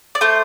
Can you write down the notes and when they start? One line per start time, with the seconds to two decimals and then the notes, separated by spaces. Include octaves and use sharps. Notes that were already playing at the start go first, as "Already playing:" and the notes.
0.15 D5
0.21 A3 C5